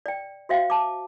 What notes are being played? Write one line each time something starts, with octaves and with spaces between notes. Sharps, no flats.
D5 G5
F#4 C5 E5 F5 G5
A5 D6